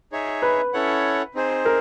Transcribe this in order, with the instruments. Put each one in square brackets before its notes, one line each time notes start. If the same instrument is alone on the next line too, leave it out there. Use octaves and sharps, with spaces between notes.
[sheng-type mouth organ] D#4 G#4 C#5 E5
[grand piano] B4
[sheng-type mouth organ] C#4 E4 A4 C#5 F#5
C4 D#4 G#4 C5
[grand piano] A#4